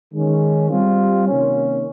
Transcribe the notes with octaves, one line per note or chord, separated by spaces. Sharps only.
D#3 G#3 C#4
G3 C4 F4
C3 D#3 A#3 C#4